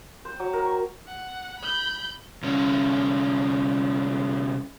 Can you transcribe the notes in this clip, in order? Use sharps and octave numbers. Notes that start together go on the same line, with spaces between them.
C5
F#3
A#4
C#6
F#5
B5 G6
C2 C#4